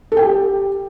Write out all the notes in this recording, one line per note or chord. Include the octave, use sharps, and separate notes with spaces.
A4
G5
G4